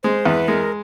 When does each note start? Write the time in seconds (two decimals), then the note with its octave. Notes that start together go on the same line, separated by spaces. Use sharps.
0.03 G#3 C5
0.25 E2 B4
0.48 G#3 A#4